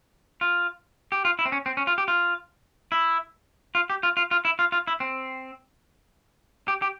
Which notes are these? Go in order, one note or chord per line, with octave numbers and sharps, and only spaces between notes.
F4
G4
F4
E4
C4
C#4
C4
C#4
F4
G4
F4
E4
F4
G4
F4
F4
F4
E4
F4
F4
E4
C4
G4
G4